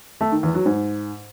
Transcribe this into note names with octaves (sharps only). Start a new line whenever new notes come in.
A3
D#3
E2
F#3
G#2